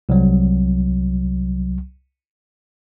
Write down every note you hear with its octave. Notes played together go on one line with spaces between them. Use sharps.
C2 F#3